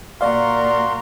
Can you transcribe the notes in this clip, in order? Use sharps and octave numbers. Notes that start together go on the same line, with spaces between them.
A#2 F#4 A#4 D5 F5 C6